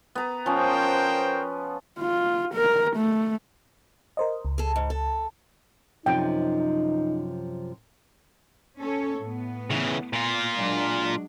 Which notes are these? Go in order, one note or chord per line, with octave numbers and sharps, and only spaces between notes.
B3 A#5
F3 C#4 A#4 C5 G5
F4
A#4
A3
A#4 C5 D#5
C#2
G#4 A4
G#2
A4
F#2 C3 F3 D#4 G5
C#4 A4 C#5
A2 B3
C#3 E3
A#2 F4
F#3 G#3 D4